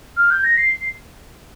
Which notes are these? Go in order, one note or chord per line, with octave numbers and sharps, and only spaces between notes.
F6
G6
A#6
C7